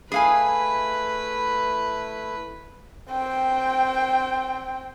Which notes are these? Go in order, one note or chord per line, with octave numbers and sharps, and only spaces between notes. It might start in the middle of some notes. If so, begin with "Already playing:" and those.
A3 E4 G#4 B4 F5 G#5
C4 G5